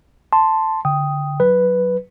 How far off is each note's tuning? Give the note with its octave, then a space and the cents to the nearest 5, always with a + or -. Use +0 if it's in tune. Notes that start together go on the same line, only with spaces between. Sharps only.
A5 +0 C6 +0
D3 -15 G5 +0 D#6 +5
F#3 +0 B4 +0